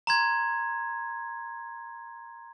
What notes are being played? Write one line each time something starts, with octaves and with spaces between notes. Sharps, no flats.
A#5 C6 G#6